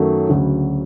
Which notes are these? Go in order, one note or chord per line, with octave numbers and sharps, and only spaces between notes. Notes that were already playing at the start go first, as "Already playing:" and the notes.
Already playing: F#2 D#3 F#3 A3
D2 C#3 F#3